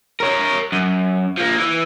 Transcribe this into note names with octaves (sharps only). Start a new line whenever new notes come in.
A#4 C#5
F#2
F3 A#3
E3